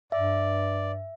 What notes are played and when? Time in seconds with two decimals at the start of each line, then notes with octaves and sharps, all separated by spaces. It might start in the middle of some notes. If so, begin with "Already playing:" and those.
0.12 G2 D5 E5